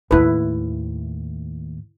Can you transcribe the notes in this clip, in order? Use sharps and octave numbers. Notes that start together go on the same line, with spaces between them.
D#2 A2 E4 B4